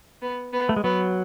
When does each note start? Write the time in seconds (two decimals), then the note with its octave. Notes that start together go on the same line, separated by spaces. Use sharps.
0.22 B3
0.53 B3
0.69 A3
0.76 G#3
0.84 F#3 B3